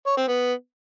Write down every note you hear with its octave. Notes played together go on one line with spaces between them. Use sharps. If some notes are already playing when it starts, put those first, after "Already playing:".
C#5
C4
B3